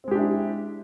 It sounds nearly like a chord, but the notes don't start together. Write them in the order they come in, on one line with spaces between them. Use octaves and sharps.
C4 G#3 G4 D4 E4